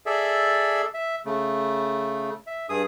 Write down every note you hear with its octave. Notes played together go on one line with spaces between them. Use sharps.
G#4 A4 D5 E5
E5
C#3 A3
E5
G2 G#4 D#6